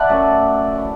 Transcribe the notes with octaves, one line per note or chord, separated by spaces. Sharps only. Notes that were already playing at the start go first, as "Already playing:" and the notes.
Already playing: D5 E5 F#5 A5 B5
F#2 F#3 A3
E3 A3